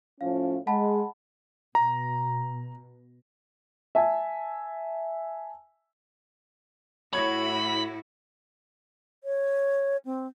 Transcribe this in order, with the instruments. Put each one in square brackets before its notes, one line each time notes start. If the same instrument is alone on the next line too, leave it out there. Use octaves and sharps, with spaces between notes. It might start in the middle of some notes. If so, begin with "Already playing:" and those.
[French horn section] A2 F3 C#4 [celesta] F5
[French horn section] G#3 [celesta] F#5 A5 B5
[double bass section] B2 [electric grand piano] A#5
[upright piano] E5 G#5 A5
[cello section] A2 E4 F#4 [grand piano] C#5 G#6 [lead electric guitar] B5
[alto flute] C#5
C4